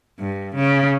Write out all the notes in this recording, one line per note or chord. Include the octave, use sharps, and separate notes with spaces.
G2
C#3